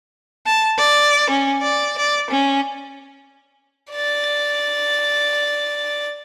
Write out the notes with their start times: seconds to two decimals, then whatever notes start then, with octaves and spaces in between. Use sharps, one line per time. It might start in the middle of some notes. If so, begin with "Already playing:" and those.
0.46 A5
0.78 D5
1.30 C#4
1.62 D5
1.98 D5
2.31 C#4
3.92 D5 A6